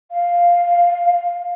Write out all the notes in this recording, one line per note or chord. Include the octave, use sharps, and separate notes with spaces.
F5